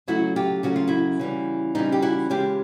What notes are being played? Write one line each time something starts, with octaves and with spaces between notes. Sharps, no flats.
C#3 F#3 A3 E4 F#4
F4 G4
C#3 F#3 A3 F#4
F4
E4 F#4
C#3 E3 G3
C#3 E3 G3 D#4 F4
G4
E4 F#4
C#3 E3 G#3 F4 G4